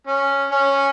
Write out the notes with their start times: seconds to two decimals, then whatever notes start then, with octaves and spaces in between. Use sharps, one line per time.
0.07 C#4
0.52 C#4